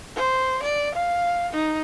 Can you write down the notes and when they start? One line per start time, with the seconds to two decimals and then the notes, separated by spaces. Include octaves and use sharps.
0.16 C5
0.63 D5
0.95 F5
1.53 D#4